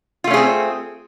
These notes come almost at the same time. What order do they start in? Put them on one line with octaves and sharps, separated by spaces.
F4 A3 C#4 G#4 C4